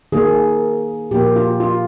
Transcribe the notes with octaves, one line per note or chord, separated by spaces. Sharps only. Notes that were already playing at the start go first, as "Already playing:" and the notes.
D#3 A#3 G#4
A#2 F3 A#3 G4
F4
F4